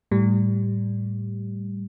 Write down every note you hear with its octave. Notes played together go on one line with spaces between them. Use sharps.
A2 G3